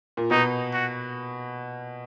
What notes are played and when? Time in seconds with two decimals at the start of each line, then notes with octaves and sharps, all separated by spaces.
0.17 A#2
0.31 B2 D#4
0.73 F#4